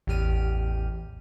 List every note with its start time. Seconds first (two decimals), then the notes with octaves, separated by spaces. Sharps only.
0.07 A1 E2 G4 F6 D#7